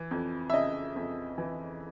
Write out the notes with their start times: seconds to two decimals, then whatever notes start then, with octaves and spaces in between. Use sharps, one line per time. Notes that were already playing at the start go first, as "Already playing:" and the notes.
Already playing: E3
0.11 F2
0.50 E5
0.53 C#3 D#5
0.96 F2
1.38 E3